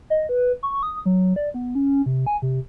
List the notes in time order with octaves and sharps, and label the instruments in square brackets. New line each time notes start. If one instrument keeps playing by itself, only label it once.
[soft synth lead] D#5
B4
C#6
D#6
F#3
D5
B3
C#4
C3
G#5
C3